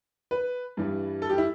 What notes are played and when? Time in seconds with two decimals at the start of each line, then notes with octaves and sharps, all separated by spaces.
0.31 B4
0.77 G2 E3 G3
1.22 A4
1.30 G4
1.38 E4